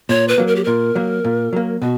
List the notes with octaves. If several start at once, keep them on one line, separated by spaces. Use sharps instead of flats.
A#2 C#5
B4
F#3 A#3
A#4
G4
A#2 A#4
F#3 A#3
A#2
F#3 A#3
B2 F#4